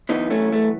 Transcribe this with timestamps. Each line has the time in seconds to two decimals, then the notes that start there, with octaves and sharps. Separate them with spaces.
0.09 F#2 E3 B3 D#4
0.30 A3 C#4
0.53 A3